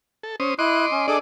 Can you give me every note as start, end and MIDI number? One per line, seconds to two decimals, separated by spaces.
0.23 0.36 69
0.40 0.54 61
0.40 0.54 72
0.40 0.54 87
0.59 0.86 64
0.59 1.07 75
0.59 1.07 84
0.59 1.07 86
0.59 0.86 90
0.92 1.06 61
1.08 1.19 62
1.08 1.17 68
1.08 1.17 69
1.08 1.19 74
1.08 1.19 75
1.08 1.17 86